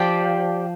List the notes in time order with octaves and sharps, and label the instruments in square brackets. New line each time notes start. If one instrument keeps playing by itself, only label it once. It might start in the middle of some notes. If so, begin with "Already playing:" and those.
Already playing: [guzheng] F3 [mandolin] G4 D5 G5